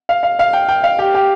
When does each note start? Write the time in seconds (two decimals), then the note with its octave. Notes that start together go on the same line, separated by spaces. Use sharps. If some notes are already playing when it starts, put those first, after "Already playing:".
0.09 F5
0.23 F5
0.39 F5
0.53 G5
0.69 G5
0.84 F5
0.99 G4
1.15 G4